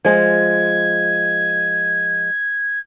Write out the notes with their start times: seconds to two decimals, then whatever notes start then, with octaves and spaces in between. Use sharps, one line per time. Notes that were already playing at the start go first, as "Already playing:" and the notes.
0.05 F3 G#3 G#6